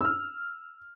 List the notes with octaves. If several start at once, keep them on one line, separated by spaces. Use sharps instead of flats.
E6 F6